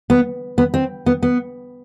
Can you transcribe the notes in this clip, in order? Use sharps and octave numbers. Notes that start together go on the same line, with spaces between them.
B3
B3
C4
B3
B3